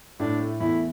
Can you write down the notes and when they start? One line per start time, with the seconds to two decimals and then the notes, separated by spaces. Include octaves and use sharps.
0.20 A2 D4
0.40 A3
0.60 E2 E4